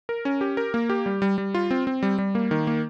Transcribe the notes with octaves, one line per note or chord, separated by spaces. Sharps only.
A#4
C#4
G4
A#4
A#3
G4
G3
G3
G3
F4
C4
C4
G3
G3
A#3
D#3
A#3